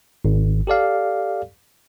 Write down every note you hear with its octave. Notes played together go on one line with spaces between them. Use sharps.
G#1
G4 A4 D5 F5